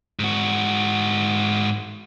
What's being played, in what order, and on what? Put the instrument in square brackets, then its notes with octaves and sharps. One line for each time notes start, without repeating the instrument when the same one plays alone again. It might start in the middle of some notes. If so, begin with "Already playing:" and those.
[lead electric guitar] G#2 F#4